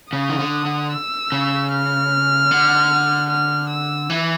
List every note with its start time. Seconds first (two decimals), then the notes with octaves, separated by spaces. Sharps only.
0.13 C#3 D#6
0.29 D#3
0.39 D3
0.65 D3
0.93 E6
1.32 C#3
1.72 F6
2.51 D3
3.30 F6
3.70 E6
4.10 E3